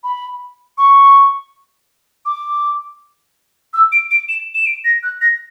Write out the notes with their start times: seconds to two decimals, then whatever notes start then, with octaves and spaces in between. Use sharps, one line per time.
0.03 B5
0.78 C#6
2.25 D6
3.74 E6
3.92 D7
4.11 D7
4.28 E7
4.55 E7
4.66 D7
4.84 A#6
5.03 F#6
5.21 A#6